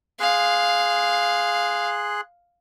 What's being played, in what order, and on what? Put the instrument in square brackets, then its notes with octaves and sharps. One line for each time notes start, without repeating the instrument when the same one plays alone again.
[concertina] G#4 C6 F#6 [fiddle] F5